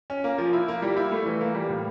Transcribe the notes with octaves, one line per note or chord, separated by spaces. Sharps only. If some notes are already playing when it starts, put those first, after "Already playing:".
C#4
A#3
F3
E4
A#3
G3
E4
A3
E3
A#3
G3
A2